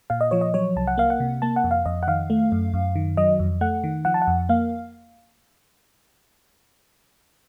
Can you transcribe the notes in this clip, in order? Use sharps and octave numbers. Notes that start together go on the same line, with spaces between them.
A#2 F5
D#5
F3 C#5
D#5
F#3 C#5
C2 A5
F#5
A#3 F5
F#5
C3
A#3 A5
F#5
F2
F5
F2 D#5
F#5
D#3 F5
A3
F#2
F#2
D#3
F#3 D#5
F2
A3 F#5
D#3
F3 F#5
A5
F#5
F2
A#3 F5